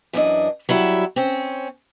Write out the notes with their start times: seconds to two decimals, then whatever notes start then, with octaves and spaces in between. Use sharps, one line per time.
0.13 F#2 E3 D4 D#5
0.69 F#3 G3 E4
1.16 C4 C#4